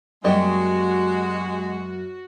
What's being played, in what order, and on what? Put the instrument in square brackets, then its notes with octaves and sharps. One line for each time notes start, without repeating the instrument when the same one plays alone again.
[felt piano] F#2 A#3 C#6 [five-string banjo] G3 D#5 [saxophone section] G#3 [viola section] F#4